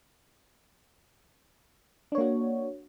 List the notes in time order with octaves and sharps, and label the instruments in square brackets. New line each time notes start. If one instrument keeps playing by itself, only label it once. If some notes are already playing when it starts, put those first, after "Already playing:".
[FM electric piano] D4
C#5
A#3
F#4